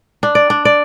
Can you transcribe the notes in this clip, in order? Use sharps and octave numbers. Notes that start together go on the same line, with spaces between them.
D4
D5
D4
D5